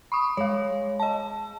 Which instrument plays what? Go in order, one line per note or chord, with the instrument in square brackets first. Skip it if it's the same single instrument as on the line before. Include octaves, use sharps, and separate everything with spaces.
[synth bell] B5 C#6 D#6
[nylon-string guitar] G#3 [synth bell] C#5 F5
[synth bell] D#5 A5